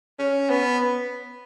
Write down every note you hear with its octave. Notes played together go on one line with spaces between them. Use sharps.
C#4
B3